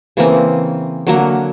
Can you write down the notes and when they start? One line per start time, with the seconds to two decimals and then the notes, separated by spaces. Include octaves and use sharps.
0.17 C#3 E3 A#3 C4
1.07 D3 F#3 A#3